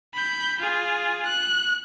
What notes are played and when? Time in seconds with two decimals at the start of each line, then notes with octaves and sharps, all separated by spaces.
0.14 B5 G6
0.60 F4 G#4
1.25 F#6